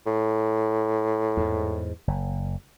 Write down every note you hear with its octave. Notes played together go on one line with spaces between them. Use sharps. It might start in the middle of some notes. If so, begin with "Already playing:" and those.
A2
E2 G#2
F#1